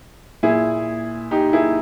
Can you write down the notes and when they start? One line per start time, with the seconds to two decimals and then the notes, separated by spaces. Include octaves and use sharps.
0.43 A#2 E4 G#4
1.31 D#4 G4
1.53 E4 G#4